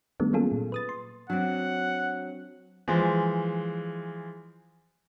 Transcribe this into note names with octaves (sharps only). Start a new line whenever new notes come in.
D#3 G3 A3 B3 D4
F#3 A#3 C#4 F4 G#4 A4
A#2
B4 D#6 A6
C6
F#3 C4 D4 F#5
E3 F3 G#3